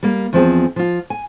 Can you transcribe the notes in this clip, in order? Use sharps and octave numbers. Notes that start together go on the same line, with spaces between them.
G3 A#3
E2 F3 C4 G#4
F3 F4
G#5